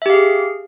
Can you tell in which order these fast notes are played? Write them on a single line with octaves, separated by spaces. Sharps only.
E5 G4 F5 G#4